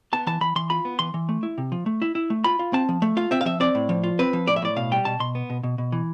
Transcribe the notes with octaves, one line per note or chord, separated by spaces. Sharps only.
B3 A5
E3 A5
E3 B5
E3 C6
F4 B5
B3
E3 C6
E3
A3
E4
C3
F3
A3
E4
E4
A3
F4 B5
F4
C4 A5
F3
A3
F4 F5
C4 E5
F5
F3 E5
C4 D5
A2
F3
F4
C4 B4
F3
A2 D5
E5
A2 D5
B2 F5
G3 G5
B2 A5
B2 C6
B3
B2
B2
B2
E3